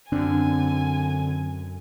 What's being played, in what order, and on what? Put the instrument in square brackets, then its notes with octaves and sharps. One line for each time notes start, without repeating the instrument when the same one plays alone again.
[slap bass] F#2 [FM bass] D3 [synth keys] C4 D4 [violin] G#5